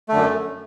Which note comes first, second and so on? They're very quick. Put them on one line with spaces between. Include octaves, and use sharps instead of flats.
A3 D3 F#2